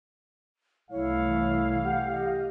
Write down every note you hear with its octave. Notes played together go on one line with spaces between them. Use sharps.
C2 E3 A3 E4 C#5 F5
G4 F#5
D#5